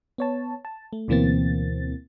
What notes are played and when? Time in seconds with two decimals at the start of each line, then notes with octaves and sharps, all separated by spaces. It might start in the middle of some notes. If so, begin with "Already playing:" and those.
0.18 B3 C#5 A5
0.65 A5
0.93 A3
1.08 D2 B2 E3 A#3 C4 A6